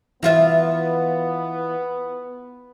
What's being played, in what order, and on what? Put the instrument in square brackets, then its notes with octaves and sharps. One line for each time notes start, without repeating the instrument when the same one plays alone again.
[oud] E3 F4 E5 [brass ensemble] B3